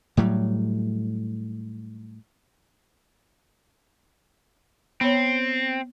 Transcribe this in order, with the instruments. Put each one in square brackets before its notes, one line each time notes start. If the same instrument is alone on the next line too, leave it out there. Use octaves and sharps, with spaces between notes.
[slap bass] A2 F#3 G3
[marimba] B3 C#5 [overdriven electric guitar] C4